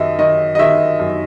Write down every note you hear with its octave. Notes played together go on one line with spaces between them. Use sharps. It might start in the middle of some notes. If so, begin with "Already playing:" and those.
Already playing: F#2 D#3 D#5 E5
D#3 D#5
D#5
D#3 E5
F#2